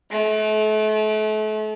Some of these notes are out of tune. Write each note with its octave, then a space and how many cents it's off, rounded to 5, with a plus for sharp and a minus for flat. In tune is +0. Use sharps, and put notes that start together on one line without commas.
A3 -35